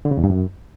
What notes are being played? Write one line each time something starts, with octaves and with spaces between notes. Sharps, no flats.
D3
C#3
E2
G2
F#2